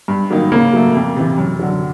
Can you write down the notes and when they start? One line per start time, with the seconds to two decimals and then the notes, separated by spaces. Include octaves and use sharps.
0.08 G2
0.30 D#3 F#3 A#3 D#4
0.52 C#3 A#3
0.73 F#3 A3
0.95 F2
1.16 C3 E3
1.38 F#2
1.59 D3 F#3